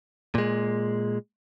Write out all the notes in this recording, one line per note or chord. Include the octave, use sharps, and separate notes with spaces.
A#2 G#3